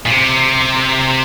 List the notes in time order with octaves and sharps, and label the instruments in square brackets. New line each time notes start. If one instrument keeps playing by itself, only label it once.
[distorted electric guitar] A#2
C3